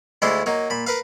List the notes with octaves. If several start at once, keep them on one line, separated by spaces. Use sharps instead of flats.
D2 G#3 E4 F4 D5 C6
F#3 A#3 D#4
A#2 B5
A#4 B4 F5